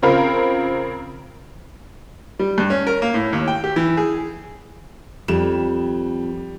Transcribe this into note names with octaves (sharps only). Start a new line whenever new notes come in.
C#3 C4 F4 A#4 F5 B5
G3
G2
C#4
A#4
A#3
A2
D#2
G5
G4
E3
G#4
F2 G3 E7